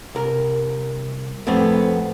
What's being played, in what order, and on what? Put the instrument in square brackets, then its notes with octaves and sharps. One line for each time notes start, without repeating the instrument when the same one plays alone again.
[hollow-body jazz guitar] C2 A#4
F2 A2 A3 B3 C4